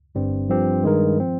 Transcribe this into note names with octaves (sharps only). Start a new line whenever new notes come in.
G1 G2 G3 C4
G2 F3 C4 G4
G2 D#3 G#3 D#4 A#4
F3 C4